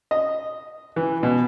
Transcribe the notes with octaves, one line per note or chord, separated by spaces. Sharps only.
D#5
E3
B2